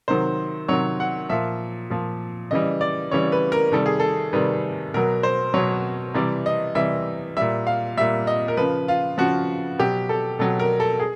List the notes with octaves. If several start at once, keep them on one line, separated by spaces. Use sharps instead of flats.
C3 D#3 F#3 C5
C3 D#3 F#3 C#5
F#5
A#2 F3 E5
A#2 F3
C#3 E3 G3 D#5
D5
C#3 E3 G3 C#5
B4
A#4
C3 D#3 G3 A4
G#4
A4
C3 D#3 G3 B4
B2 F#3 A#4
C5
B2 F#3 C#5
C3 E3 G3 D5
D#5
C3 E3 G3 E5
A#2 G3 E5
F5
A#2 G3 E5
D#5
A#4
C#3 F3 B4
F4
C#3 F3 F#4
B2 F#3 G4
A4
B2 F#3 A4
A#4
A4
G#4